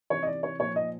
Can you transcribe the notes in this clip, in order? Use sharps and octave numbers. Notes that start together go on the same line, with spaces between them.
C3 E3 C#5
D#5
D5
C#5
A#2 F3 C#5
D#5